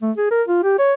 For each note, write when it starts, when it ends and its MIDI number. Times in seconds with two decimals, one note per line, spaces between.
0.02 0.12 57
0.17 0.28 68
0.31 0.43 70
0.48 0.64 65
0.64 0.74 67
0.79 0.94 73